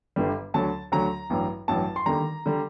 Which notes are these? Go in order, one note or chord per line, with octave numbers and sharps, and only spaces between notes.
G1 G2 D3 G3
D2 D3 F#3 A5
D2 D3 F#3 A#5
A1 G2 F#3
A1 G2 F#3 A5
C6
D#2 D3 G3 A#5
D3 G3